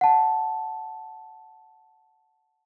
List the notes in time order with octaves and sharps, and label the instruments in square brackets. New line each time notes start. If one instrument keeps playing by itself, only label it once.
[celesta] F#5 A5